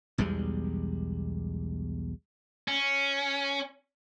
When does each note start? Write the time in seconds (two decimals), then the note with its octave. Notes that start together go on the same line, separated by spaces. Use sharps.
0.18 B1 E2 G3 G#3
2.68 C#4